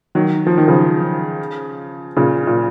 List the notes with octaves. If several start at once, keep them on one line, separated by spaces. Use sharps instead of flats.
D#3 F#3
F3
D#3
C#3 F3
A#2 C#3
A#2